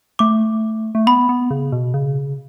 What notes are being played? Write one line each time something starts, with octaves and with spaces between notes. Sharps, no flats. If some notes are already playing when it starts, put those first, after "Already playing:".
A3 D6
A3
B3 B5
B3
C#3
B2
C#3